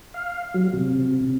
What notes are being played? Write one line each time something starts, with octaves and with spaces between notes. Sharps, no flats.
F5
F#3
C3